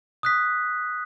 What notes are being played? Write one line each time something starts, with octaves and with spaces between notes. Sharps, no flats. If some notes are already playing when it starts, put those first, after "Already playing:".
D#6 F#6 B6